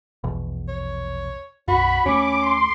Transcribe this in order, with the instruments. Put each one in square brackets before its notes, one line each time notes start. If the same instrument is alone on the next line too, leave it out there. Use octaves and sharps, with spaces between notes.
[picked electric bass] A#1 E2 B2
[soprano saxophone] C#5
[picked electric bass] B1 F#2 [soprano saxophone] F#4 [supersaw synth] B5
[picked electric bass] D#2 A3 [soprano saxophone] C#4 [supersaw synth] D6
[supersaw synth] C6